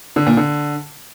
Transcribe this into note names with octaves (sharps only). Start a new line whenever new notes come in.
D3
A#2
D3